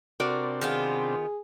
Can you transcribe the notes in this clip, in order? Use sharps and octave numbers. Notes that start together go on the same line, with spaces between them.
C3 C4 D4 F#4 A#4 D5
D#3 B3 F4 G#4